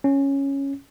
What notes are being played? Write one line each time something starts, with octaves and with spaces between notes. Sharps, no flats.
C#4